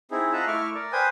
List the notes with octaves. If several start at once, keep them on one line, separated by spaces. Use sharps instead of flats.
C4 D#4 E4 G#4
F4 D#5 E5 F#5 A5 A#5
A3 E4 E5 C#6 D6 F6
A#4 D5
B4 C5 G5 G#5 D#6